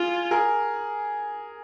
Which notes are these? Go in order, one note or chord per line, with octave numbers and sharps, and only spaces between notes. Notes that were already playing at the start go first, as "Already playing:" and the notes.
Already playing: F4 G#4
G#4 A#4